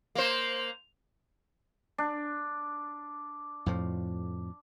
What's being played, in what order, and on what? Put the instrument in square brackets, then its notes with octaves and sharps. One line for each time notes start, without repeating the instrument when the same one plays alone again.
[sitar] A#3 C5
[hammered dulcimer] D4
[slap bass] F2 A2 F3